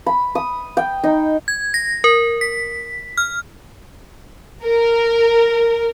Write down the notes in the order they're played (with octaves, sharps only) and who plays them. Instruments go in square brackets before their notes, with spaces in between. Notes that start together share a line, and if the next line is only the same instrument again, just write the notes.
[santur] B5
D#6
G5
D#4
[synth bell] G#6
A#6
A#4
B6
F6
[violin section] A#4